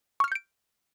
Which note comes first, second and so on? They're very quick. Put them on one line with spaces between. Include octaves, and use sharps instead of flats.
C#6 F6 C#7 G6 D7